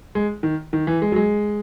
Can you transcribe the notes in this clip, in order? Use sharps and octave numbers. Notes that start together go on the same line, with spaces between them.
G#3
D#3
D#3
E3
G#3
F#3
G#3